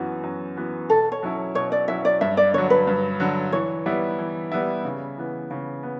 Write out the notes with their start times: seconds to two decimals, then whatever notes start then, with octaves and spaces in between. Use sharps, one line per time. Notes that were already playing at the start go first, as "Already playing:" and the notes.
Already playing: F#2 E3 B3 F#4
0.24 F#2
0.56 E3 B3 F#4
0.89 B2 A4
1.12 C#5
1.22 F#3 C#4 E4
1.55 B2 C#5
1.72 D5
1.88 F#3 C#4 E4 E5
2.05 D5
2.21 G2 E5
2.37 D5
2.54 D3 F#3 C#5
2.70 B4
2.87 G2
3.20 D3 F#3
3.53 E3 C#5
3.86 G3 B3 E4
4.19 E3
4.52 G3 B3 E4
4.85 C#3
5.18 E3 B3
5.51 C#3
5.83 B3